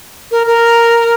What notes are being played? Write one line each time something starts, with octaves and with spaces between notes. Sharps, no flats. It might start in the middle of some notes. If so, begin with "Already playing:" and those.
A#4
A#4